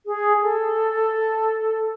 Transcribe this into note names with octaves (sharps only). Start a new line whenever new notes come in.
G#4
A4